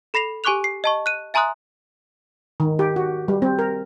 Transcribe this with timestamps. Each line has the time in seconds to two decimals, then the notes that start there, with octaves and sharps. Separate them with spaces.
0.14 A4 B5 A#6 C7 F7
0.44 G4 G#5 C#6 D6 F#6 F7
0.64 C7
0.84 D#5 A5 C#6
1.06 F#6 D#7
1.34 E5 G#5 A#5 C6 D#6 F#6
2.60 D#3
2.79 G4
2.96 F#4
3.28 G3
3.42 C4
3.59 A#4